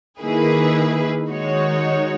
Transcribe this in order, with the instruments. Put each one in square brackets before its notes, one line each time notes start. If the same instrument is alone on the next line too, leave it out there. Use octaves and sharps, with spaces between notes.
[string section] D#3 A#3 E4 G#4 B4
D#3 G#3 D#4 F#4 C#5